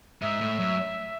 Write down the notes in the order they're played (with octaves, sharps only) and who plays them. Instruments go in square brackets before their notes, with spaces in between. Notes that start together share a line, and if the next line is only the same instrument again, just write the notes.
[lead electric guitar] G#2 [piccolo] E5
[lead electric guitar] A2
F#2